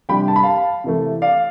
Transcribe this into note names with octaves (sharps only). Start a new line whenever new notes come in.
C3 G3 D4 G5 B5
A5
B5
F5 A5
C3 E3 A3
D5 F5